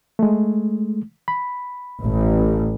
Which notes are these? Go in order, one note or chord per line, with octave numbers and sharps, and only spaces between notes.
G#3 A3
B5
A1